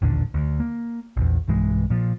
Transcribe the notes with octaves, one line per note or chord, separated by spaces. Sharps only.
A1 D#2 A#2 D3
D2
A#3
A#1 E2
B1 G2 E3 G#3
A#2 F3